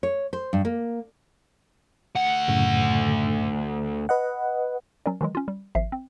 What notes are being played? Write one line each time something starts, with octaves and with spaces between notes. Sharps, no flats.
C#5
C5
G2
A#3
D2 F#5
F#2 A2 C#3
B4 D#5 F#5
F#3 C#4 A#4 D5
D#3 E3 F#3 G#3
C#4 F4
G3
G#1 F3 E5 C7
C4